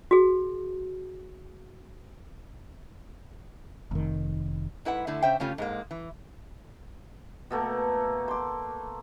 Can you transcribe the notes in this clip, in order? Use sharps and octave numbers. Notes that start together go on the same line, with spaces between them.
F#4 G#4
F1 D#3
G#2 E4 B4 F#5
D3 A3 E4 A4
C#3 C5 E5 G5
C#3 A3 C#4 F4 G4
G#2 G#3 A#3
E3
B2 A3 A#3
C6 D6